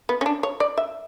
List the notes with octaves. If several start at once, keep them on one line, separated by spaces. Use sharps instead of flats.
B3
C#4
D4
C#5
D5
E5